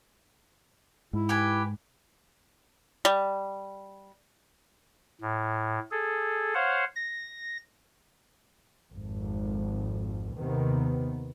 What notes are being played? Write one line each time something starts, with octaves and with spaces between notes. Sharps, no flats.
G#2 E4
G4 B4 G#5
G3
A2
G#4 A4
C5 C#5 F5 F#5
A#6
G#1 F2
D#2 C3 D#3 B3